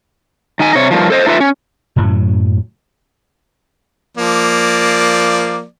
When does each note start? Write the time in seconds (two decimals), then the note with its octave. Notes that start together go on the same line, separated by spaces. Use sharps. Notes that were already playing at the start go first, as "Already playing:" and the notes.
0.60 D#3 D#4 G#5
0.75 C3 C#5
0.91 G2 A#2 D#3 F3
1.10 A4 C5 D#5
1.26 A3 D#4 F4 B4 E5
1.40 C#4
1.96 F#2 A2 C#3 F#3
4.17 F3 A#3 D5